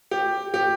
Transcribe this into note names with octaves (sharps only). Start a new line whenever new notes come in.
G4
G4